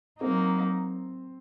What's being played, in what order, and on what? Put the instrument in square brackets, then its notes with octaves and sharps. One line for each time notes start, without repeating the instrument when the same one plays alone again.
[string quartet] F#3 A#3 D#4 [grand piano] C4